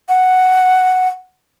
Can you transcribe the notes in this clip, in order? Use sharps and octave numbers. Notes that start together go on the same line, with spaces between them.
F#5